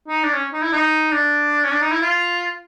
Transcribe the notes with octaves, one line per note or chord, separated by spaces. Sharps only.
D#4
D4
C#4
D#4
E4
D#4
D4
C#4
D4
D#4
E4
F4